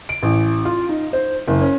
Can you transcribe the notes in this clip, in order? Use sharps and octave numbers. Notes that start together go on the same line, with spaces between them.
D7
A1
F4
D#4
C5
F#1
C#4